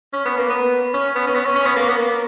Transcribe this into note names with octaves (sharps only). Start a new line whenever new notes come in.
C#4
B3
A#3
B3
C#4
B3
C#4
B3
C#4
C#4
B3
A#3
B3
A#3